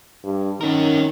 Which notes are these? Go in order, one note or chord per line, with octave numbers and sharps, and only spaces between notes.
G2
D#3 C#4 A#4